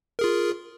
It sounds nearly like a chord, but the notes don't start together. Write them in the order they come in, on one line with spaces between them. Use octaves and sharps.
A#4 G#4 F4